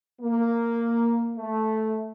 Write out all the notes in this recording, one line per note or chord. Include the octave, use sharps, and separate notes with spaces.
A#3
A3